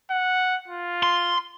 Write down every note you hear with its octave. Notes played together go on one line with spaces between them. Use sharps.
F#5
F4
C6